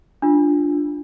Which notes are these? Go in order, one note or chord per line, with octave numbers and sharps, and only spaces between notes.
D4 F4